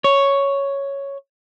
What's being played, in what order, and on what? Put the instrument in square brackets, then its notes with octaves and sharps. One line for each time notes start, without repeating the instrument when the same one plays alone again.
[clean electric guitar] C#5